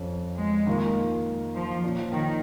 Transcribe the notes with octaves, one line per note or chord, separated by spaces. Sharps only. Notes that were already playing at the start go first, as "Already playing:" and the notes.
Already playing: F2 F3 C#4
G#3
D#3 A#3 F4 A#4
F3
A#2 F3 C#4
D#3